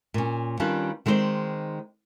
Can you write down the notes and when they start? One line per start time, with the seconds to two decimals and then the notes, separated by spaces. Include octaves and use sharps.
0.14 A#2 C#4
0.60 D#3 G3 C#4 D4 F4 B4
1.06 D#3 G#3 C4 G#4 C5 D5